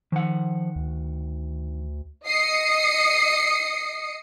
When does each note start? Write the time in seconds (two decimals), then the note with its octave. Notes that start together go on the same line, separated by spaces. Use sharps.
0.12 D#3 F3 F#5
0.76 D2
2.26 D#5 D#6 C7 C#7